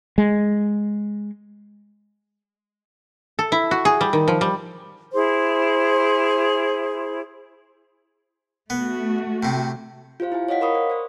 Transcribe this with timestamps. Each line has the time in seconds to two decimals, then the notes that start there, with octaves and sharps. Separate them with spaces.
0.18 G#3
3.39 A4
3.52 E4
3.71 F#4
3.85 G#4
4.01 G3
4.13 D#3
4.28 F3
4.41 G3
5.13 E4 G#4 C5
8.70 A3 B3 F#4
9.43 A2 C3
10.20 F4 G4 C5 F5
10.32 E4 C5 G#5
10.48 C#5 D#5 F5 F#5 B6
10.61 A#4 B5 C#6 D#6
10.75 C5 D5
10.90 C5 D5